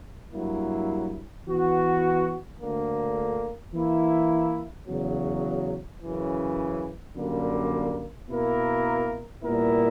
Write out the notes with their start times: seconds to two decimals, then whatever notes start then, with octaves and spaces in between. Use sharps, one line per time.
0.33 G2 F#3 A#3 E4
1.46 E3 B3 F#4
2.60 D2 D3 A#3
3.73 E3 A#3 E4
4.87 E2 C#3 F#3
6.01 F#2 C#3 E3
7.16 F#2 D3 G3 A#3
8.29 B2 A#3 E4 A#4
9.42 A#2 G3 B3 E4 A#4